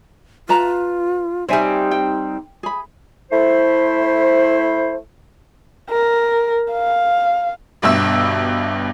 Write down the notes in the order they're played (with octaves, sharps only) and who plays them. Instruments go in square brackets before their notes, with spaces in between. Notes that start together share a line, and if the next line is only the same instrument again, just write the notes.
[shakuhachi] F4 [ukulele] B4 A5 A#5
[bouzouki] G3 C4 [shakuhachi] D#4 [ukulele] C#5 E5 G#5
[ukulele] G5
G#4 B5
[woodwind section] A3 E4 C5
[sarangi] A#4
F5
[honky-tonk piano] G1 G2 B2 E5 E6